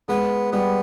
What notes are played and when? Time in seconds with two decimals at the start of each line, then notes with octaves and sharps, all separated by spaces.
0.09 G#3 B3
0.52 G3 B3